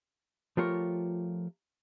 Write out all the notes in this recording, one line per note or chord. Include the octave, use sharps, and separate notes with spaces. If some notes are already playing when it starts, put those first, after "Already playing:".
F3 A3 F4 G4 A#4 C#5